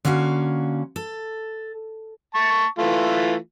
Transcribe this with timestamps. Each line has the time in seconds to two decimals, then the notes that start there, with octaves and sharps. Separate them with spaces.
0.05 D3 A#3 C#4 F#4 F5
0.96 A4
2.34 A5 C#6
2.79 E3 A3 F4